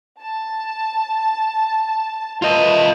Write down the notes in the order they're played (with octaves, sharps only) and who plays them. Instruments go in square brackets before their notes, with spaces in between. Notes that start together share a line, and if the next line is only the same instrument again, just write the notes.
[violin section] A5
[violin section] A3 A#4 B4 [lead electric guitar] F4 D#5